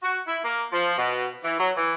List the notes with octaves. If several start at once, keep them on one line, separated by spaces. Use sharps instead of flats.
F#4
E4
A#3
F3
B2
E3
F#3
E3